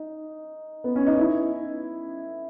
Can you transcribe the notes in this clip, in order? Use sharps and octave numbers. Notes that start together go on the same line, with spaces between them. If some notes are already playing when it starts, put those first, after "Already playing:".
Already playing: D#4
B3
C#4
D#4
E4